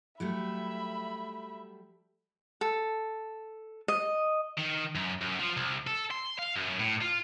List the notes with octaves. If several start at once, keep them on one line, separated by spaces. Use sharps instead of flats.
F#3 G3 A3 E5 B5
A4
D#5
D#3
F#2
F#2
F3
C2
A4
C6
F5
F#2
A2
F4